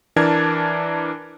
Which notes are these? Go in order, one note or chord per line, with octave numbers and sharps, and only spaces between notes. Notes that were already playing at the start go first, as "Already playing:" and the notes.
E3 D4 A#4 A5 G#6